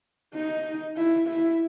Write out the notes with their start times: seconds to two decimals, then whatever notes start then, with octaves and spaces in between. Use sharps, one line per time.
0.35 D#4
0.96 E4
1.28 E4